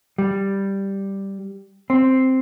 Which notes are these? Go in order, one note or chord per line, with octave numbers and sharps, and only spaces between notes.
G3
C4